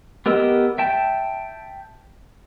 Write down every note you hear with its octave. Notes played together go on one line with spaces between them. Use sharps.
B3 G4 A#4 D#5 E6
E5 G5 A5